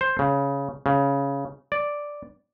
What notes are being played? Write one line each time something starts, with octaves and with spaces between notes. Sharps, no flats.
C5
C#3
C#3
D5